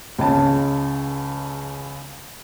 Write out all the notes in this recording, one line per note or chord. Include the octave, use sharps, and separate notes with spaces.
C#2 C#3 A5